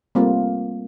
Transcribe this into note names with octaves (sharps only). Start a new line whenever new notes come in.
G3 A3 A#3 C4 F4